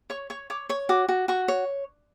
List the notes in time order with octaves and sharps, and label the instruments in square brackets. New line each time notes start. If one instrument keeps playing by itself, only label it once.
[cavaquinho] C#5 C#6
C#5 C#6
C#5 D6
C#5 C#6
F#4 D6
F#4
F#4 C#6
C#5